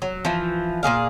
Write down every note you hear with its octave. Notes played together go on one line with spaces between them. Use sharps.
F#3
E3 F3
A#2 G3 G#4 F5